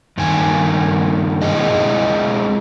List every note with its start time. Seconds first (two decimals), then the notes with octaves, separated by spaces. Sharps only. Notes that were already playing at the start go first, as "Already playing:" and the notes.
0.18 G2 D#3 A#3 G#5
1.42 G#3 C4 C#4 E4 G#4 D#5